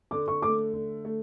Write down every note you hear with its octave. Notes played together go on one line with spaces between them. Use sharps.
D3 D6
C#6
A3 D6
D3
A3